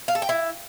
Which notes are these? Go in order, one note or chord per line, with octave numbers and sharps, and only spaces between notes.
F5
A4
G5
E4